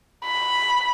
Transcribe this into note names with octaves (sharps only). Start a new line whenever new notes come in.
B5